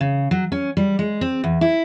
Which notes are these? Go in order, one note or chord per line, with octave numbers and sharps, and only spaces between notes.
C#3
F#3
C#4
G3
G#3
C4
E2
E4